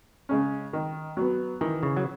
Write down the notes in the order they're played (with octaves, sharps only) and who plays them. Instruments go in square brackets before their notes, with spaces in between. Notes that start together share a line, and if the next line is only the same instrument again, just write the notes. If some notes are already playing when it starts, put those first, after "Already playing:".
[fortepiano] C#3 G#3 C#4
D#3
F#3 B3
[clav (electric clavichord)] D#3 [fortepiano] E3
[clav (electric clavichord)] C#3
F#3